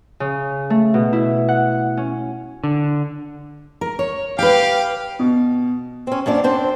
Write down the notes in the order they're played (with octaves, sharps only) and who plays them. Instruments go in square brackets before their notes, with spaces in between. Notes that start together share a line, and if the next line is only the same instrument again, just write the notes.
[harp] C#3
A3
B2
E4
F#5
C#4
[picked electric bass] D3
[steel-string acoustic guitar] A#4
C#5
[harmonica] G4 F5 [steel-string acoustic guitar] B4 G5
[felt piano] B2
[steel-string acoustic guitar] C4 C#4
F#2 A#3 D4 D5
C4 D4 C5